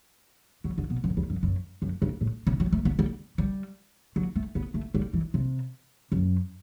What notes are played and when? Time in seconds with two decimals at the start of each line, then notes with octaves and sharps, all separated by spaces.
0.64 F#3
0.78 D3
0.90 B2
1.04 F#2
1.17 E2
1.30 F#2
1.43 F#2
1.82 F#2
2.02 G2
2.21 A2
2.47 C3
2.60 F#3
2.73 A3
2.85 B3
2.99 G3
3.38 G3
4.16 F#3
4.36 A3
4.55 B3
4.74 A3
4.94 G3
5.13 E3
5.34 C3
6.12 F#2